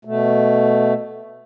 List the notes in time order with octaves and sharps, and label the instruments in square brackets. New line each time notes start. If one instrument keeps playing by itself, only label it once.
[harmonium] B2 A3